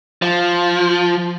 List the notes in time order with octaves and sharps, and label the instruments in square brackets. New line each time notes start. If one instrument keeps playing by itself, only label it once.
[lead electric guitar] F3